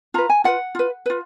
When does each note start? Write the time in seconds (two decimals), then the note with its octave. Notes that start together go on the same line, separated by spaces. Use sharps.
0.14 F4 B4 A#5
0.30 G#5
0.44 F4 B4 F#5
0.75 F4 B4
1.06 F4 B4